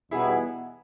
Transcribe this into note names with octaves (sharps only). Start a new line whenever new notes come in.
E2 B2 G3 B3 D#4 E4 G#4